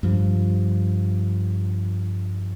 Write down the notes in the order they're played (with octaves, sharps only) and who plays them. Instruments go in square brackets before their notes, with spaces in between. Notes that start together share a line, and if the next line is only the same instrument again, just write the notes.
[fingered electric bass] G2 F3